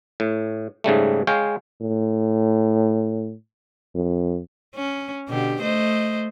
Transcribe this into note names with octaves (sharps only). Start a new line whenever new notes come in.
A2
G#2 C#3 G3 A3
G#3 C#5 F5 G5
A2
F2
C#4
B2 D3 G4
A3 C5 D#5